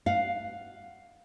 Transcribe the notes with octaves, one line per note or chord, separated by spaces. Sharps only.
F5 F#5